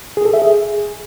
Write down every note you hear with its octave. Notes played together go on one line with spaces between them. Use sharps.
G#4
A4
E5
G#4